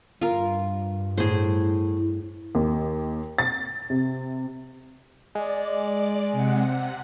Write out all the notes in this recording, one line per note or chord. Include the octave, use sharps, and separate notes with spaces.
G2 F4 A#4
A2 G#4 C5
D#2
A6
C3
G#3 D5
C3 F#5